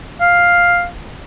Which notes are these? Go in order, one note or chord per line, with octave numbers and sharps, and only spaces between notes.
F5